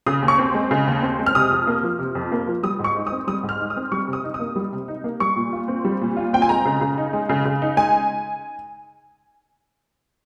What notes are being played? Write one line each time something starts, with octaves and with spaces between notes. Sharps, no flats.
C#3 D#6
D#2
C#6
C4
G#3
C#3
D#2
C4
G#3
F6
C3 D#6
F2
A#3
F3
C3
F2
A#3
F3
G3 D#6
G#2
C#6
D#4
D#6
C4
G3 D#6
G#2
F6
D#4
D#6
C4
G3 C#6
C3
D#6
D#4
D#6
A#3
G3
C3
D#4
A#3
G3 C#6
A#2
F4
C4
G3
A#2
F4
C4 G5
G#5
G#3 A#5
C#3
C#3
D#4
G#3
C#3
C#3
D#4
G#3 G#5